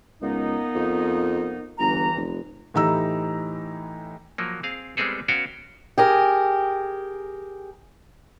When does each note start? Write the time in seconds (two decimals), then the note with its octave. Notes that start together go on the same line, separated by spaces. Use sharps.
0.22 C#2 A#3 B3 D#4
0.75 F2
1.79 G1 C#2 E3 A#5
2.16 F1
2.74 A2 E3 D#4 G4 A#5 E6
4.38 F3 F#3 A#3
4.63 C4 G#4 F5
4.97 G3 G#3 B3 C4 G#4 A4
5.28 B3 C#4 F#4 F5 G5
5.98 G4 G#4 A#4